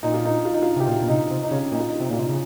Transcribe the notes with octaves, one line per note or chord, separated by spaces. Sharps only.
A#2 D#4
F4
D#4
F4
D#4
F4
C3 G4
A#2 F4
A#2
C3 D#4
C3
D#4
C#3 C#4
A#2 D#4
F4
D#4
F4
C3
D#4
A#2 F4
C3 D#4
C#3